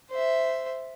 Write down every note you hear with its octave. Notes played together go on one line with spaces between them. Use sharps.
C5 E5